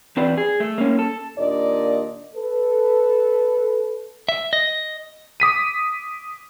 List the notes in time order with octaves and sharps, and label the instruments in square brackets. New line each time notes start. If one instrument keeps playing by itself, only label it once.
[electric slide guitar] E2 C4 B4 D5
G#4
A3
A#3 C#4
A4
[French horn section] D#2 A#2 D4 A#4 D5 D#5
A4 B4
[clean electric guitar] E5
D#5
[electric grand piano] D6 D#6 B6 D#7